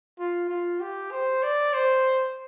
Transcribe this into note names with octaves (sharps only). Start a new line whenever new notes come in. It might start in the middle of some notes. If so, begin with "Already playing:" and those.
F4
F4
G4
C5
D5
C5